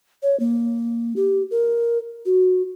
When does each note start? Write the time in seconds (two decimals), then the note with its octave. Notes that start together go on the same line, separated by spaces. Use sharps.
0.23 C#5
0.40 A#3
1.16 G4
1.51 A#4
2.26 F#4